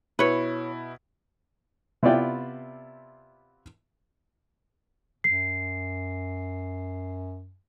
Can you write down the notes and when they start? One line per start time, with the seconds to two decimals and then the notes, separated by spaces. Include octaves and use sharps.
0.19 B2 E4 B4 C#5
2.03 C3 B3 E4 F4 D5 G5
5.24 F#2 C7